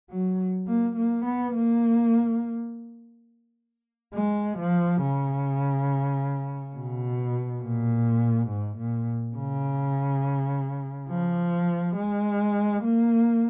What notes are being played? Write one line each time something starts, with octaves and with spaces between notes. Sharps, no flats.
F#3
A#3
A#3
B3
A#3
G#3
F3
C#3
B2
A#2
G#2
A#2
C#3
F3
G#3
A#3